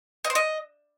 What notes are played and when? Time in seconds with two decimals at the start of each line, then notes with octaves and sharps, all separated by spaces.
0.25 D#5
0.30 C5
0.35 D#5